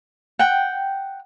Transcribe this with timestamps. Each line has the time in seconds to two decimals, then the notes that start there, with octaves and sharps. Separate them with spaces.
0.39 F#5 G5